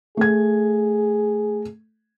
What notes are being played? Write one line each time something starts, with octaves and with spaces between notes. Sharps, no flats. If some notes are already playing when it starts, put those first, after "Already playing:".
A3 G#4 G#6